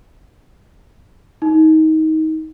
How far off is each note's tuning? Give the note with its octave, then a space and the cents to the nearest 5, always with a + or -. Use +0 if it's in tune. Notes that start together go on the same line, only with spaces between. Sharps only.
D#4 +25